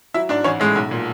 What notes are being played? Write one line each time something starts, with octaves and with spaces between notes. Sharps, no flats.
F#3 E4 E5
G#2 D4 D5
A1 C#4 C#5
A2 G#3 G#4
B1
A#2